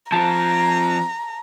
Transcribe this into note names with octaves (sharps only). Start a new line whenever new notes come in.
F3 C4 A5 A#5